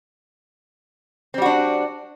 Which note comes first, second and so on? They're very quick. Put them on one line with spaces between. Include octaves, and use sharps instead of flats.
C4 G3 F#4 D4